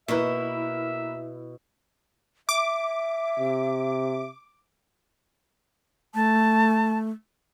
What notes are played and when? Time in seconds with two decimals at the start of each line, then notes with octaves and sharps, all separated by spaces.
0.08 B2 A#3 E4 A#4 B4 E5
2.49 E5 D6
3.39 C3
6.15 A3 A5